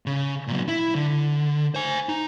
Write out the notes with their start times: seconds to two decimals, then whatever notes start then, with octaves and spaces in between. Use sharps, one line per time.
0.06 C#3
0.47 A#2 F#3
0.68 E4
0.95 D3
1.75 C5 G#5
2.09 D#4